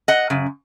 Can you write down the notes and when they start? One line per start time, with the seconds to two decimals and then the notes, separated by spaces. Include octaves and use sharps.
0.08 D#5 F#5
0.30 F#2 C#3